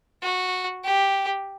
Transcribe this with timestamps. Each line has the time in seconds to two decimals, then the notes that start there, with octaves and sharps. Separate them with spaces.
0.22 F#4
0.84 G4